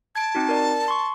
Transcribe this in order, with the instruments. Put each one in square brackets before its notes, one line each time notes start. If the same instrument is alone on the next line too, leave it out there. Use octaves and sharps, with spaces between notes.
[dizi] A5 [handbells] G#6 D7
[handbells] C4 D#4 F#4
A#4 D5
C6 C#6